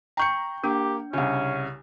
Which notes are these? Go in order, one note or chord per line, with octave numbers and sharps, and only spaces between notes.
G5 A#5 C#6 G6 C#7
A#3 D4 G4
C2 C#3 C#4